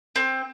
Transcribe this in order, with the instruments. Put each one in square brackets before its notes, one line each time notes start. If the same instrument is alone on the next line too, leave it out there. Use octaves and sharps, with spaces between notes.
[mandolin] C4